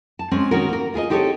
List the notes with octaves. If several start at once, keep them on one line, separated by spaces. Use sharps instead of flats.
A5
G#3 C4 C#4
G#2 D#3 C#4 F#4 A#4
A#3 A#4
F4 G#4 A#4 D#5
C4 D#4 G4 A4 B4 C#5